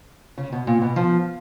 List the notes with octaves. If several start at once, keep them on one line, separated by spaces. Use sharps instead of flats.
C#3
B2
A#2
B2
F3